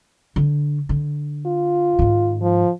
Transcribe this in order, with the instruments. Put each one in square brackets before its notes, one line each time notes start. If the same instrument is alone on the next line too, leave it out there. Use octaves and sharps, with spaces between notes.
[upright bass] D3
D3
[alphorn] F4
[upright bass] G#2 D#3
[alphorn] F3